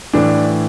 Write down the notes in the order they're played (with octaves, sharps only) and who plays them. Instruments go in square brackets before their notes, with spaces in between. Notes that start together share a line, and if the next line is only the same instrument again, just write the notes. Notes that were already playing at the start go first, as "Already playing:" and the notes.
[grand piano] A2 E3 D4